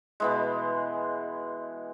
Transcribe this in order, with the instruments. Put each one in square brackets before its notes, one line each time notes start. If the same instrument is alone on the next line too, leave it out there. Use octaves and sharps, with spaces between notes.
[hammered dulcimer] B2 E3 G#3